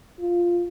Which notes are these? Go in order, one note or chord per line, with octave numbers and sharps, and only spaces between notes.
F4